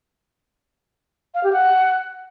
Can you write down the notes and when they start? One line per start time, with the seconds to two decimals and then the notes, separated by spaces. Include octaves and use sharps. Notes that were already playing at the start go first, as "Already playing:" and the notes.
1.34 F5
1.44 G4
1.53 F#5